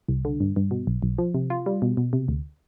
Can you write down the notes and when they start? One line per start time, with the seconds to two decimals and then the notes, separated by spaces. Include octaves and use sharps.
0.08 C2
0.25 D3
0.40 G2
0.56 G2
0.71 B2
0.87 B1
1.02 B1
1.18 F3
1.34 C3
1.50 F4
1.66 G3
1.82 B2
1.97 B2
2.13 C3
2.28 D2